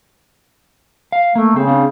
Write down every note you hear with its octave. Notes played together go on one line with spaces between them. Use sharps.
F5
A3 A#3
C#3 C4
C4 D4